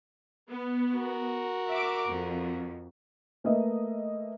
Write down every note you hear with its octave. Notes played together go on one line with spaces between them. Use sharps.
B3
F#4 A#4
E5 D6
F2
A3 A#3 A#4 B4 D#5 E5